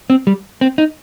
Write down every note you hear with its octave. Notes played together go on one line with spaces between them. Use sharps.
C4
G3
C4
D#4